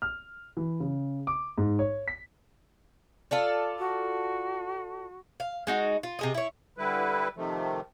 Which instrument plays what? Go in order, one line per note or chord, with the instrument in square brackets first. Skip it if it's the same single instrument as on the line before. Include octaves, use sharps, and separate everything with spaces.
[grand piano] F6
E3
C#3
D6
G#2
C#5
B6
[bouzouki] F4 A4 D5
[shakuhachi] F#4
[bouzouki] F5
G#3 D#4 F#4
F4
C3 G#4 D#5
E4 C#5
[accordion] D3 G3 E4 B4
C3 D#3 F3 A3